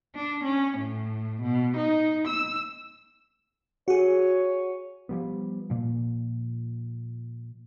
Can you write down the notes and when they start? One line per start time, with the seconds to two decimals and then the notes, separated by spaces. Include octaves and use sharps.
0.14 D4
0.44 C#4
0.78 A2
1.42 B2
1.76 D#4
2.27 E6
3.88 F#4 G#4 C#5
5.09 F3 G3 B3
5.70 A#2 F3